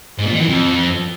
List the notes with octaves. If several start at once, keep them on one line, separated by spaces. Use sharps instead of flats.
G#2
A#2
D#3
E3
F2